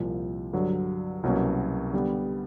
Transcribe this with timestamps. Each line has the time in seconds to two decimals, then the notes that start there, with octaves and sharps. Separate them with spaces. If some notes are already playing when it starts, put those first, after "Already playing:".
Already playing: C2 A#2 F3
0.53 G2 D3 F#3
1.23 C2 B2 F#3 A#3 C#4
1.93 D3 G3 B3